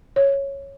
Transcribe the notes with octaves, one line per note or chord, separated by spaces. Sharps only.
C#5